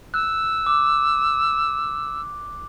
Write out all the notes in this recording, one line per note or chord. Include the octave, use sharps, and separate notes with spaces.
E6 F#6
D6